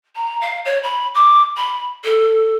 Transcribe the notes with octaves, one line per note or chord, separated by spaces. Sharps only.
A#5
F5
C#5
B5
D6
B5
A4